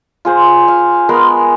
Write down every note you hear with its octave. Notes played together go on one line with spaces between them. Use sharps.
F4 G#4 C5
F5
G#3 B3 A#4 C6